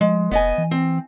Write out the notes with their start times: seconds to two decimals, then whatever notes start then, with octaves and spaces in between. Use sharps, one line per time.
0.01 F3 G#3
0.31 F1 B3 D#5 G#5
0.58 E3
0.71 C4